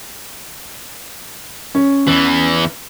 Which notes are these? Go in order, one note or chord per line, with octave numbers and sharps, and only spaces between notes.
C#4
E2 E3